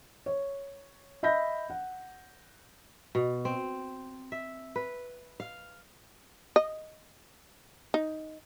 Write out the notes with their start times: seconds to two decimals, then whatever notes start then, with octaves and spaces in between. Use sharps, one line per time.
0.26 C#5
1.23 D#5 E5 B5 G6 A#6
1.70 F#5
3.15 B2
3.45 C4
4.32 E5
4.76 B4
5.40 F5
6.56 D#5
7.94 D#4